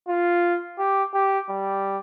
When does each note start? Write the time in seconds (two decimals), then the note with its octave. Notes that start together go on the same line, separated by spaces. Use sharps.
0.08 F4
0.79 G4
1.14 G4
1.49 G3